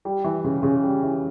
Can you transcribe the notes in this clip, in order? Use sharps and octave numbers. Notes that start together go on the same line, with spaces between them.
G3
E3
C#3
C#3
G3
E3